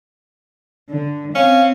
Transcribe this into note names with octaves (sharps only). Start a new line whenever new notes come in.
D3
C4 C#4 F5